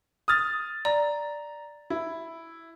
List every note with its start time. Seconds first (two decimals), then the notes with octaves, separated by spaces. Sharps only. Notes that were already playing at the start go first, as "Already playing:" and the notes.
0.28 D#6 F6 A6
0.85 D5 A#5
1.90 E4